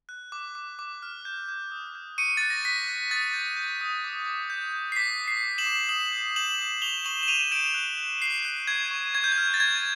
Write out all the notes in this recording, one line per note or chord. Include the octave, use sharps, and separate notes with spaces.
F#6
D6
D6
D6
F6
G6
G6
D#6
G6
C#6 C#7 D#7
F#6 A6
A#6
F#6 B6
F#6
D#6 A6
G6
G6
D#6
D6
D6
G6
G6
C7
D6 B6
D6
C7
D6
E7 F#7
D6
D#6 E7 F#7
G6
G6 E7 F#7
D#6
C#6 F7 G7
C#6 E7 F#7
E7
C#6 D#7 F7
G6 D7 E7
F#6
F#6
F#6 C7
F#6
C#6 G#6
C#6
C#6 G#6
G6
G#6
F6
A6
C#6 G#6